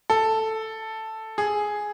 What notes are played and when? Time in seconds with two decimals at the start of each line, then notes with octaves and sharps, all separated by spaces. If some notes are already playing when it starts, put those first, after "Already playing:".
0.10 A4
1.38 G#4